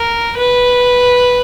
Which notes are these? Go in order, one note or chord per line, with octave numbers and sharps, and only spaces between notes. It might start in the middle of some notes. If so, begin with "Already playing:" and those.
Already playing: A#4
B4